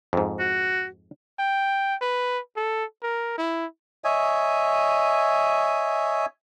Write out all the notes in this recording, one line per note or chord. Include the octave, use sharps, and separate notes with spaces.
F2 G#2
F#4
G5
B4
A4
A#4
E4
C#5 D#5 E5 G#5